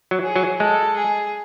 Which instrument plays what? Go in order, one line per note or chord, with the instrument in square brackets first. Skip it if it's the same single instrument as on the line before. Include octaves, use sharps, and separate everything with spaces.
[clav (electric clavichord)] F#3
[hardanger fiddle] G#4
[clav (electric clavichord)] F#3
[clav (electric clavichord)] G#3 [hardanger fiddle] A4
[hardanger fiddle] G#4